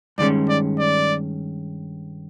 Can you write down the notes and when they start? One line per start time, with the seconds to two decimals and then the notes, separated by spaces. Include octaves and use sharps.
0.18 G2 D#3 G#3 C#4 D5
0.49 D5
0.79 D5